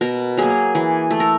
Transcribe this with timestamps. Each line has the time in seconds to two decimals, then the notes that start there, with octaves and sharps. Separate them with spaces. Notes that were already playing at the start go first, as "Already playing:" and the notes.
0.01 B2 A#4
0.37 F#3 A#3 G#4
0.75 E3 G#4
1.11 A3 A4
1.20 A#4